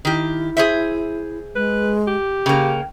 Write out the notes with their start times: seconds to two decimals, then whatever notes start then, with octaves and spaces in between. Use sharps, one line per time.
0.05 D#3 E4 G4
0.57 G#4 C5 E5
1.55 G#3 B4
2.07 G4
2.46 C#3 A#3 G5